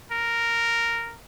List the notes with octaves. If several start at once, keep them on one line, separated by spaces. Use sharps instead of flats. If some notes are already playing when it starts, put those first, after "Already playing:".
A#4